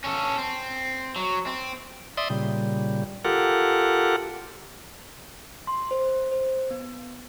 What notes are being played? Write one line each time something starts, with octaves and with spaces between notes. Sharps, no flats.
C#4 A4
C4
F#3
C4
D5 E5 C6 D#6
A#2 C#3 G3
F4 G4 A4 A#4 F#5
C6
C5
C5
B3